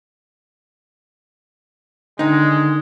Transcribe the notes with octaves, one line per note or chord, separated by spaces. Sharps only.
D3 D#3 G#3 D#4